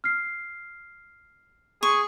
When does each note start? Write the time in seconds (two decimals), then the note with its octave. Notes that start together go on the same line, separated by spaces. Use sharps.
0.04 F6 C7
1.83 G#4 C#6